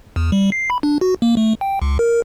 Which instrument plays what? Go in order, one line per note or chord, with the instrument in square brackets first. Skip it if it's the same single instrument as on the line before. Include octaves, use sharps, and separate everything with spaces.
[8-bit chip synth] E2
G3
C7
B5
D4
F#4
A#3
A3
G5
C#2
A#4